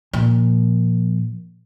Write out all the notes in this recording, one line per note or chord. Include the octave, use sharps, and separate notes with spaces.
A#2 F3